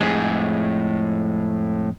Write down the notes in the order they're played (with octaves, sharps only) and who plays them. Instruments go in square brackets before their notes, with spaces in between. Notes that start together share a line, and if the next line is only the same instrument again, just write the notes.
[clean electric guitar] F2 G#3 [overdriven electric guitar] A2 G#4